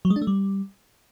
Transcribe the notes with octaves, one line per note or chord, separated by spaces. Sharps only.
F#3
G#3
D4
A3
G3